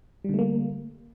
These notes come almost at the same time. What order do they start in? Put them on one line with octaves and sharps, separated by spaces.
G3 D3 A3 A#3